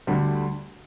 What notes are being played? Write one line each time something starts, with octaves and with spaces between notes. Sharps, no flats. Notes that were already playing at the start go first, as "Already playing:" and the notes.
D2 D3 G3